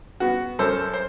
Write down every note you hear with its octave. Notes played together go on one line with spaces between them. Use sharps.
B3 F#4
F#2 A4 C5
C5